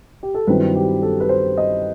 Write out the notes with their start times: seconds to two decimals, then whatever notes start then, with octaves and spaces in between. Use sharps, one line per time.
0.23 G4
0.34 A4
0.47 G2 D#3 F#3 C4 E4 B4
0.75 G4
1.02 A4
1.20 B4
1.29 C5
1.57 D#5